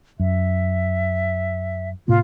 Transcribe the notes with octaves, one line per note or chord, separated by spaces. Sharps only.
F#2 E5
A2 C3 A#3 F4